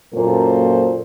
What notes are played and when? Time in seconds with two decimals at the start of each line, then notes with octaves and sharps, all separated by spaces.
0.14 F#2 A#2 A#3 A4 C5